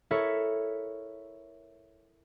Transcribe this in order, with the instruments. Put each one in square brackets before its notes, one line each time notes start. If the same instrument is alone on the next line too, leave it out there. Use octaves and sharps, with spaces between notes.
[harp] E4 A4 A#4 C#5 E5